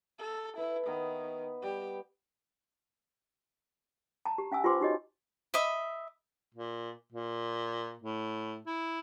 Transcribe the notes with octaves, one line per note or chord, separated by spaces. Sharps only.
A4
E4 B4
D#3 B3
G3 G4
A5 A#5
G4
C#4 F5 G#5 E6
F4 G4 B4 C5 C6 D6
D#4 F#4 G4 C#5 D#5
D#5 E5 B5
A#2
A#2
A2
E4